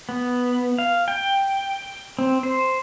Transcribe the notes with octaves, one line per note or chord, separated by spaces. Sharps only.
B3
F5
G5
C4
C5